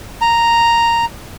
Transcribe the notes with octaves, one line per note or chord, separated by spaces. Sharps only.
A#5